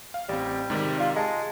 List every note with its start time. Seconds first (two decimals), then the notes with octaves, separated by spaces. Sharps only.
0.14 F5
0.29 A1 G3 C4
0.70 G#2 C3 D#3
1.00 F4
1.16 G#3 A5 A#5